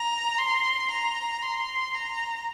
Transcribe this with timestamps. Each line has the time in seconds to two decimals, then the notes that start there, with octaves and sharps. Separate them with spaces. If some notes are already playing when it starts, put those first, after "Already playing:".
Already playing: A#5
0.38 C6
0.91 A#5
1.42 C6
1.94 A#5